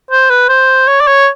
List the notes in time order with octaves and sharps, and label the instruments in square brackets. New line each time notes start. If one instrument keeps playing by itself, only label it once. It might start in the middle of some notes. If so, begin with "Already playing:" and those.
[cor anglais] C5
B4
C5
C#5
D5
C#5